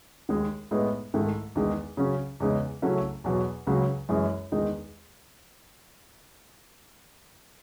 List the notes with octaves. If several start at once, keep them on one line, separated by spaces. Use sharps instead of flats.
D#2 D#3 G#3
A2 G#3 B3 D#4
G#2 D#3 A3 E4
E2 D#3 G#3 D#4
C#3 F#3 C#4
E2 C#3 G#3 D#4
C#3 F#3 A3 C#4 E4
E2 B2 F#3
C#2 C#3 F#3
F#2 E3 G#3
E2 D#3 G#3 D#4